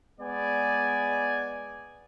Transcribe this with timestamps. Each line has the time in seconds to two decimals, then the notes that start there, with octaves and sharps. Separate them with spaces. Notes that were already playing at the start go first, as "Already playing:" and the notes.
0.20 G#3 B3 D5 G#5